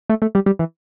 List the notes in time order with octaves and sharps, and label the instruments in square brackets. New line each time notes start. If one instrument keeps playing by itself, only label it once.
[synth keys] A3
A3
G3
G3
E3